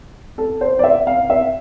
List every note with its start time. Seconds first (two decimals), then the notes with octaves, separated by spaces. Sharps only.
0.38 A4
0.61 C5
0.79 D5
0.84 E5
1.07 F5
1.30 E5